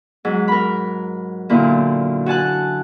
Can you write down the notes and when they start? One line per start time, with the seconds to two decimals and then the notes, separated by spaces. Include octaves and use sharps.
0.25 G#2 F#3
0.48 A#4 B5
1.49 F#2 A#2 D3 A#3 E4
2.26 F#4 G#5 A5 F#6